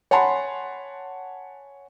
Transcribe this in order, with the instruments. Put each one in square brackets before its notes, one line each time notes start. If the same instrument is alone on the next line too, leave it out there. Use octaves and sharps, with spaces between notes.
[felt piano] C#5 F#5 G#5 A5 B5 C6